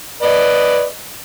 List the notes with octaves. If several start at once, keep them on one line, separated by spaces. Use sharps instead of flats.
B4 D5 D#5